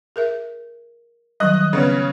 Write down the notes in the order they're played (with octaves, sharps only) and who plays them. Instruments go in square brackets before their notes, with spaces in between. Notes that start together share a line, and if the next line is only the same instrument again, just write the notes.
[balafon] G#4 A#4 E5
[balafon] D#3 F#3 G3 [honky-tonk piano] D#5 F#6
[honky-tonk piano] C#3 B3 C#4